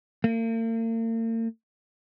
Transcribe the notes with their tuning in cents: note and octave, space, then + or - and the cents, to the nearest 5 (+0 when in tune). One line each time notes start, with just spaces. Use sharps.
A#3 -45